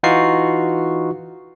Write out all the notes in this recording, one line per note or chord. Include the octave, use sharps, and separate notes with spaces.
E3 D#4 F4 F#4 C#6 C7